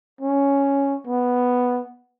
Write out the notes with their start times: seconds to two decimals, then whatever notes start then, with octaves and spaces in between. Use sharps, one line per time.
0.21 C#4
1.07 B3